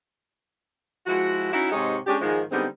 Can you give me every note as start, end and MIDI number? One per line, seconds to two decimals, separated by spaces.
1.07 1.51 53
1.07 1.51 56
1.07 1.51 64
1.07 1.51 66
1.53 1.69 61
1.53 1.69 63
1.53 1.69 64
1.53 1.69 66
1.72 1.98 44
1.72 1.98 48
1.72 1.98 56
1.72 1.98 63
1.72 1.98 67
1.72 1.98 73
2.07 2.17 56
2.07 2.17 61
2.07 2.17 62
2.07 2.17 67
2.21 2.42 44
2.21 2.42 51
2.21 2.42 53
2.21 2.42 56
2.51 2.66 50
2.51 2.66 55
2.51 2.66 56
2.51 2.66 59
2.51 2.66 60
2.51 2.66 63